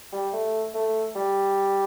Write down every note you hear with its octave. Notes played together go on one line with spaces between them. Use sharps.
G3
A3
A3
G3